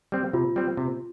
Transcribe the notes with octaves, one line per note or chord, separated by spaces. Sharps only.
G3 C4
C3 F4
G3 C4
C3